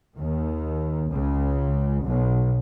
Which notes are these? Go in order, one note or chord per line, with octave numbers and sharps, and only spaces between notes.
D#2 D#3
C#2 C#3
B1 B2